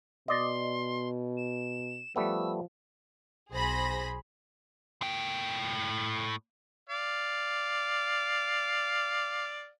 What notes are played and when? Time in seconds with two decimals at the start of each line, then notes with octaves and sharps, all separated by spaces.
0.28 B2 D5 D#5 C6
1.37 E7
2.16 F3 G3 A3 B3 E6
3.50 B1 G#4 C5 B5 A#6
5.02 A2 G5
6.90 D5 F5